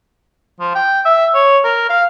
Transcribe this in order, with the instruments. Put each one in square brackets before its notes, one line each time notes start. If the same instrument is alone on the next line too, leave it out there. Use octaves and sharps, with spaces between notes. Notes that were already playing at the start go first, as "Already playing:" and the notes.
[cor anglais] F3
G5
E5
C#5
A#4
F5